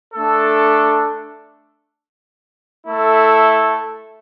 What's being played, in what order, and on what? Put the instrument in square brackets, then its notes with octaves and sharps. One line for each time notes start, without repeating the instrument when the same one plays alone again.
[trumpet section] A3 D4 A4
A3 E4 A4